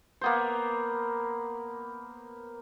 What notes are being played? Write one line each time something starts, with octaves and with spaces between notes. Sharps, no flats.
A#3 B3 C5